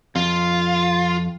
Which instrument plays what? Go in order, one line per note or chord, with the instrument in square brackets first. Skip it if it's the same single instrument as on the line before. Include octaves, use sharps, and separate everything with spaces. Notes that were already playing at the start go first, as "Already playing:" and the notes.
[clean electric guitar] F2 [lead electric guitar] F4